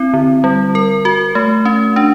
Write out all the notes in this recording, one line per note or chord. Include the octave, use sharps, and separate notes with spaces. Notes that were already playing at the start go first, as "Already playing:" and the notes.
Already playing: C4 E4
D3
G3
A#4
F#4
A3
C#4
D4